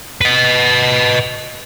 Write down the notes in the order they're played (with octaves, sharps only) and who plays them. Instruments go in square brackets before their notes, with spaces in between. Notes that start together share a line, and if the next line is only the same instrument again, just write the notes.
[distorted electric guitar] B4 D#5